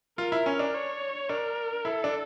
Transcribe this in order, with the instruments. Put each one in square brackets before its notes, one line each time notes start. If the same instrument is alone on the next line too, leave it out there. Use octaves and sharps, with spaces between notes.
[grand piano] F4 [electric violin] A#4
[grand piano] E4
C#4
D4
[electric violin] C#5
[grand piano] D4 [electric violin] A#4
[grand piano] E4 [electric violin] A4
[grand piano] D4